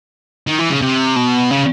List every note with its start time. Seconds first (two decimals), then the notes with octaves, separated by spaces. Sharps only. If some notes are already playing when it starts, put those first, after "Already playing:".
0.47 D#3
0.59 E3
0.70 C#3
0.82 C3
1.16 B2
1.51 C#3